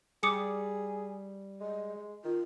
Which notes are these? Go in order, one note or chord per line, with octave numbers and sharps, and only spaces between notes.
G3 G#4 D6 D#6 C#7
G#3 D#5
D#3 F4